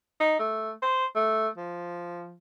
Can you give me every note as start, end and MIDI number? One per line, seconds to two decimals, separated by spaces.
0.21 0.38 63
0.39 0.72 57
0.82 1.06 72
1.15 1.48 57
1.57 2.35 53